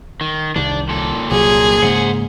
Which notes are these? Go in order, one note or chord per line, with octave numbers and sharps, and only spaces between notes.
D#3
C2 D#3 D4
A#2 A4
C2 F#3 G#4
G#2 C#3 A#3 C5 F#5